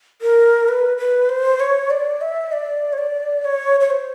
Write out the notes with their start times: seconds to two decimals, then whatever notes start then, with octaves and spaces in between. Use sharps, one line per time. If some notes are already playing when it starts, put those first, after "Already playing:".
0.22 A#4
0.68 B4
0.98 B4
1.29 C5
1.60 C#5
1.90 D5
2.21 E5
2.52 D5
2.93 C#5
2.98 D5
3.45 C#5
3.80 C#5
3.90 C5